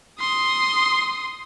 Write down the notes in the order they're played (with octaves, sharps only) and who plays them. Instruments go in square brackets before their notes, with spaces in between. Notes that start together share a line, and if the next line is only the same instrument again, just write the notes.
[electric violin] C6 D#6